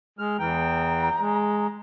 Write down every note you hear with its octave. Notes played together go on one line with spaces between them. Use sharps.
G#3 F6
E2 E3 G5 A#5
G#3